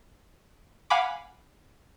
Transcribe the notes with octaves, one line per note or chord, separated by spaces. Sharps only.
F5 F#5 G#5 B5 D6